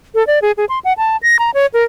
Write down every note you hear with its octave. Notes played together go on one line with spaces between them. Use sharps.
A4
D5
G#4
G#4
C6
F#5
A5
A#6
A#5
C#5
A#4